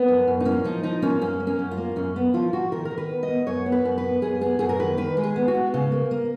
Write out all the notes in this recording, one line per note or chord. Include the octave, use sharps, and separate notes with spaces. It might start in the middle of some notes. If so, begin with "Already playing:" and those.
Already playing: B3
F#2
F#2
D#4
A#3 C#4
F3 D#4
F3 D#4
A#3 C#4
F#2 C#4
A#3
C#4
F#2
F4
A#3
F#2 C#4
A#3 B3
F3 F4
F3 F#4
D#3 A#4
A#4
D#3
B4
B3
D#5
B3
F#2 C#5
B3
B4
F#2
B4
B3
F#2 G#4
B3 G#4
F#2 G#4
A#4
D#3 B4
D#3 B4
G#3
G#4
B3
F#4
G#3
C#3
A#3
A#3